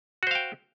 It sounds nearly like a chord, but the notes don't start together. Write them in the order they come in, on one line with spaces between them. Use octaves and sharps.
F#4 C5 F5 G5